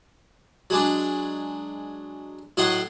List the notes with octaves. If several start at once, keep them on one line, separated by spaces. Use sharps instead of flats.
F#3 G#3 D4
A2 F#3 C#5 D#5 F#5 C6